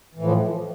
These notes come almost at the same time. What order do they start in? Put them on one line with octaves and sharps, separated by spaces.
E3 A2 F3